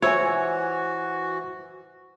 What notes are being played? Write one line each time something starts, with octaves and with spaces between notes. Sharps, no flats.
E3 F4 F#4 C5 C#5 E5 G#5 E6